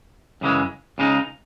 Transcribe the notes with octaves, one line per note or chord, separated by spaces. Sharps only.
F#2 C#3 E3 G#3
C#2 C#3 G#3 D#4